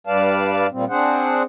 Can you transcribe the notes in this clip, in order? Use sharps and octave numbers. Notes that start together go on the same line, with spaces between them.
G2 G3 B4 D5 F5 A5
A#2 F3 G3 C4
C4 D4 G#4 C5 F#5